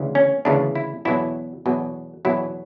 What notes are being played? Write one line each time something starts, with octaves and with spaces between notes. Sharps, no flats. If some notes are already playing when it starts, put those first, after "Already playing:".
Already playing: D2 C#3 E3
C#4
D2 C#3 E3 D4
E4
E2 B2 F#3 E4
E2 B2 F#3
E2 B2 F#3 E4